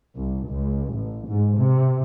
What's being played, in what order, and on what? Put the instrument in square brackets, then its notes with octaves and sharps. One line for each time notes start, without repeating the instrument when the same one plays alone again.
[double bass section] C2
C#2
A1
G#2
C3